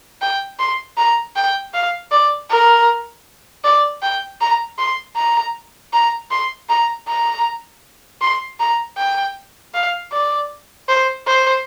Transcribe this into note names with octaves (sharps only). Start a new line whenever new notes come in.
G5
C6
A#5
G5
F5
D5
A#4
D5
G5
A#5
C6
A#5
A#5
C6
A#5
A#5
C6
A#5
G5
F5
D5
C5
C5